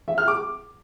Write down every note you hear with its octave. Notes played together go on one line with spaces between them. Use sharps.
E5
F6
D6